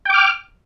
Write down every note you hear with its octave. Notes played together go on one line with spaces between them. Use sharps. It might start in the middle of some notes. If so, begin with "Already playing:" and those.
G5 D6 F6